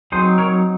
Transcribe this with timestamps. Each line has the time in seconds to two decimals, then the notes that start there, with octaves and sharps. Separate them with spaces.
0.12 F#3 C4 D#4 G#4 C5
0.38 A#4 C#5